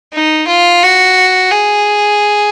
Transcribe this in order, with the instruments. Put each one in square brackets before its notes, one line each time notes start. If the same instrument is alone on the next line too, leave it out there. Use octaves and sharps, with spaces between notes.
[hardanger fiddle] D#4
F4
F#4
G#4